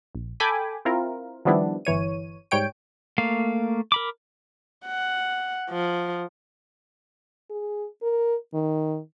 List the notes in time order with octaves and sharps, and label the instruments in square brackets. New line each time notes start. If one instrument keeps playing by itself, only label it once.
[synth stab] A#1
A4 G5 G#5 B5 D6
C4 E4 F4 A#4
D#3 F3 G3 B3 D4 E4
G1 E3 C#5 D#7
G#2 G3 C#5 G5 D7
[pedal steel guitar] A3 A#3 F5
A#4 B5 D6
[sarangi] F#5
F3
[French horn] G#4
A#4
D#3